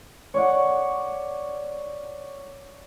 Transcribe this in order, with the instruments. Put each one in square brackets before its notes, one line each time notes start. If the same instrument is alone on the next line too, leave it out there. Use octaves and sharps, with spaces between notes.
[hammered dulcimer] C#5 D5 F#5